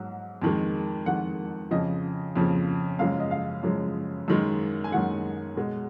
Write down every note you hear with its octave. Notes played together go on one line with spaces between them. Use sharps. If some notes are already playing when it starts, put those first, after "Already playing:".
Already playing: G#2 F#3
F2 D#3 G#3
F2 D#3 G#3 F#5
F2 C#3 F3 D#5
F2 C#3 F3
F#2 C#3 F3 G#3 F5
D#5
F5
F#2 C#3 F3 G#3
F#2 D#3 G#3
G#5
F#2 D#3 G#3 F#5
B2 G#3